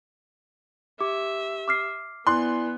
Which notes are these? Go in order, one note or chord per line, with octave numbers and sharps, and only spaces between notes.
G4 E5 D6
D6 F6 C7
B3 E4 D5 G#5 C6 F#6